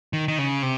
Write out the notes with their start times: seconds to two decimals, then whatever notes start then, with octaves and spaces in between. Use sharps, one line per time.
0.13 D#3
0.28 D#3
0.39 C#3
0.63 C3